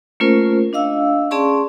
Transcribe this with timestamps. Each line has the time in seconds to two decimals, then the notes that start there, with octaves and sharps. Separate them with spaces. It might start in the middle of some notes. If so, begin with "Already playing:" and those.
0.20 A3 A#3 C#4 F4 A#4 C5
0.73 D4 D#5 F5 E6
1.31 C#4 G#4 D5 A5 C6 C#6